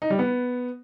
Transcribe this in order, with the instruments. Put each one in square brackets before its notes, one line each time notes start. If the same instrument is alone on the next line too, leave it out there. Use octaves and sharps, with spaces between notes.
[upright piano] D#4
G3
B3